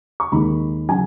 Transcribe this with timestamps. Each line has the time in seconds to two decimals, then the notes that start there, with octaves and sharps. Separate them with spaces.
0.20 C#6
0.32 D#2 D#3 G#3 B5
0.89 C#3 F#3 G#5